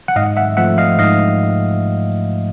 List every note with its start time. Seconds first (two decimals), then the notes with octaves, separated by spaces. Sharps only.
0.08 F#5
0.16 G#2 D#5 F5
0.37 E5 F#5
0.57 F3 A3 E5 F#5
0.78 D#5 F5
0.99 G#2 D#5 F5